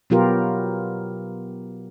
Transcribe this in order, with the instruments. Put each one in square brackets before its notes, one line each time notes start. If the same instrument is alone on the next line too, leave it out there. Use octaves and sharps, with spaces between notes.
[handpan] B2 F#3 B3 F4 G4 A#4